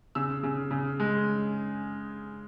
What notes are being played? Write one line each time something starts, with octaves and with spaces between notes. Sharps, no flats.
C#3 E6
C#3
C#3
G#3